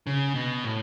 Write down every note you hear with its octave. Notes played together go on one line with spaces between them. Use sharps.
C#3
B2
A2